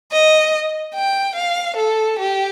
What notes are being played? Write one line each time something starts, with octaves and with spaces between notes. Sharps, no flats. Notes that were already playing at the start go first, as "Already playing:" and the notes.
D#5
G5
F5
A4
G4